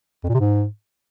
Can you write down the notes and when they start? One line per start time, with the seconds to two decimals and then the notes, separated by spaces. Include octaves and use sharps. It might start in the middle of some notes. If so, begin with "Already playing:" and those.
0.24 F2
0.29 A#2
0.34 C3
0.40 G#2